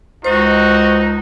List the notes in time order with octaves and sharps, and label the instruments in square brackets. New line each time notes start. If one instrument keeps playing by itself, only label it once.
[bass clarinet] C#2 [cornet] D#4 [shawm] F#4 [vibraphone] C5